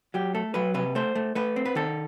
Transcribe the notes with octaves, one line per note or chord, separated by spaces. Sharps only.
F#3 G4
A3 A4
F#3 B4
C3 B4
A3 C5
A3
A3 B4
C4
B4
D#3 A4